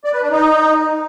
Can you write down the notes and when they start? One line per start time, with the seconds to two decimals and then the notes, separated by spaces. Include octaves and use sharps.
0.04 D5
0.13 B4
0.22 D4
0.31 D#4